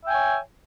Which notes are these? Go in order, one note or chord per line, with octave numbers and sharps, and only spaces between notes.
C#5 E5 G5 G#5